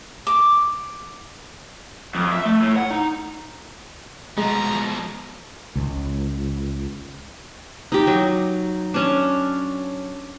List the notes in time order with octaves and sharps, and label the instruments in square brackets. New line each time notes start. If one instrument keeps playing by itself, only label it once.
[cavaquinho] D6
[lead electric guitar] F2
E5
A3
A2
F#5
D#4
[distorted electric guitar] B2 F3 [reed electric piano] G#3 [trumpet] A#5
[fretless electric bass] C#2
[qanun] D#4 G4
F#3
C#4 D4